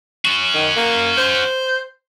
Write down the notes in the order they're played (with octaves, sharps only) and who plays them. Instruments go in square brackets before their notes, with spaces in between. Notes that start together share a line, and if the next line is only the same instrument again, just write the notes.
[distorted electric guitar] C#4 F#4
[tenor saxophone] D#3
A#3
C5